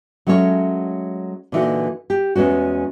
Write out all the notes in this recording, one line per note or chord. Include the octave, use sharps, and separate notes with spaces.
F#3 G#3 A3 C#4 C#5
A#2 D3 E3 D#4 F#4
G4
E2 G#3 B3 C#4 F#4